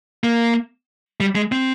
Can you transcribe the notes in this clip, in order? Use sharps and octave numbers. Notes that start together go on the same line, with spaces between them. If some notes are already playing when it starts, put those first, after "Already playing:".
A#3
G3
G#3
C4